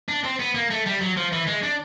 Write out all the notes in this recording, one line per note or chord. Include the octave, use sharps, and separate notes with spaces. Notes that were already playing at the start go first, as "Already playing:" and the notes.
D4
C4
B3
A#3
A3
G3
F#3
F3
E3
G#3
D4